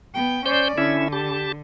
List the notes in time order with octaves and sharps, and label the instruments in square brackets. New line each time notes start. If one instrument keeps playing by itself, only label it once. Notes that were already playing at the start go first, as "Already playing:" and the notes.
[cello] B3 G5
[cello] C#4 D5 [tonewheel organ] C5 G6
[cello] D3 [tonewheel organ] C#4 E4 E5
[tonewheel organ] G4 A5